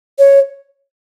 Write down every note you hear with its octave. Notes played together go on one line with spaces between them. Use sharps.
C#5